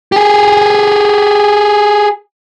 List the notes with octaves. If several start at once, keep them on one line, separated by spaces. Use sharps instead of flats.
G4 G#4